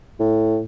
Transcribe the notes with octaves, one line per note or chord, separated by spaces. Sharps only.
A2